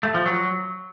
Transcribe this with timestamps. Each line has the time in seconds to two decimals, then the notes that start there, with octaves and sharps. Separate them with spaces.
0.03 A3
0.14 F3
0.26 F#3